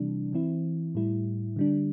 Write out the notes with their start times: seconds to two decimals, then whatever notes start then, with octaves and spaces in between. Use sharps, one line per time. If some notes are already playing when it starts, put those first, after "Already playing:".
Already playing: C3 E3 G3 D4
0.33 E3 C4 E4
0.95 A2 G3 E4
1.56 D3 G3 D4